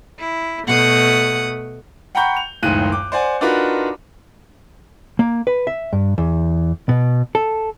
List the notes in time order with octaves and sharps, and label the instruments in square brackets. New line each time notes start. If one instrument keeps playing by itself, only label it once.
[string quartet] E4
B2 A3 F#5 D#6
[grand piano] F#5 G5 A#5 B5 C#6 G6
F7
F#1 C#2 A2 D#3 F#6 D#7
D6
C5 D5 F#5 G#5
D4 D#4 F4 F#4 A#4 B4
[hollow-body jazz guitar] A#3
B4
E5
G2
E2
B2
A4